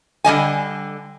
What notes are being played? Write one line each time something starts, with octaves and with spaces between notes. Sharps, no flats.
D3 G3 D#5 G#5